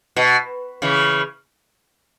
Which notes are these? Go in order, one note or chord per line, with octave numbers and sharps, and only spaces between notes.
B2
C#3 E3